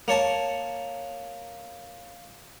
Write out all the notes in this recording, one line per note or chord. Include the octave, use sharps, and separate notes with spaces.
A#3 C#5 A5